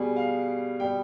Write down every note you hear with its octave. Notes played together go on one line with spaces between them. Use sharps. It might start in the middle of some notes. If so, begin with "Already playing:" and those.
Already playing: B2 G3 G#4
F5
B2 G3 G5